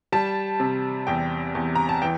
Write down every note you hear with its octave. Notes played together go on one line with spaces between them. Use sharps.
G3 A5
C3
E2 G5
E2
A#5
A5
E3 G5